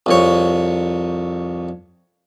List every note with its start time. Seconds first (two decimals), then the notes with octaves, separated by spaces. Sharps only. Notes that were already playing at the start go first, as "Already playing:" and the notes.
0.06 C2 F2 C#5